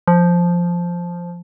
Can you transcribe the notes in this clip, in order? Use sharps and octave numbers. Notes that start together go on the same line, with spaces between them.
F3